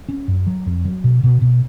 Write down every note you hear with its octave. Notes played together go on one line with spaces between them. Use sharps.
C#4
F#2
F#3
F2
F#3
B2
B2
B2